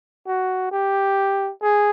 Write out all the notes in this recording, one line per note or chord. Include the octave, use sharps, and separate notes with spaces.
F#4
G4
G#4